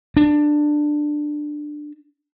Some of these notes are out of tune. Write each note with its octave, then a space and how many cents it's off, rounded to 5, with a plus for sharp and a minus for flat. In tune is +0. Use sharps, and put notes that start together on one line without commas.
D4 +15